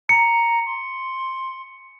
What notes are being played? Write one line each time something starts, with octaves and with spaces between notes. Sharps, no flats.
A#5 C#7
C6